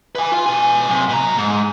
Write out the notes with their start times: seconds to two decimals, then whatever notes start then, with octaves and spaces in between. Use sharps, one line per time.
0.15 B4 G#5
0.32 F4
0.46 B2 G#5
0.89 F#2 C3
1.09 B2 A#5
1.38 G#2